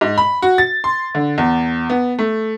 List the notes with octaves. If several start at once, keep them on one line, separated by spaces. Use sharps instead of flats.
G#2
B5
F#4
A6
C6
D3
E2
B3
A3